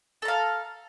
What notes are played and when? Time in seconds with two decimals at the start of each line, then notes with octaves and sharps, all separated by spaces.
0.22 A4
0.25 A#5
0.28 F5